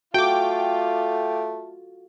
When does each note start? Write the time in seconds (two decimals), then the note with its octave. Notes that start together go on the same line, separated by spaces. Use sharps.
0.14 A3 F4 F#4 A4 G5 D6